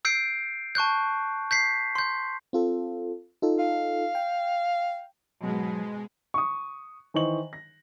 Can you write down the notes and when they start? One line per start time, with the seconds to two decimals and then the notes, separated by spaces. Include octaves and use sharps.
0.05 E6 G6 C7 D7
0.75 A5 C#6 F#6 G6
1.51 G6 B6 C7
1.95 C6 G6
2.53 C4 F4 A4
3.42 D#4 F4 A4
3.59 F5
4.15 G5
5.42 G#2 B2 F#3 G#3
6.34 C#6 D#6
7.14 D#3 E3 C5 D#5 C#6 F#7
7.53 A#6